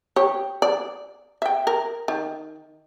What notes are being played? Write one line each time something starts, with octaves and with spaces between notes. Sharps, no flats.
G4 C#5
D5
E5 G5
A#4
D#3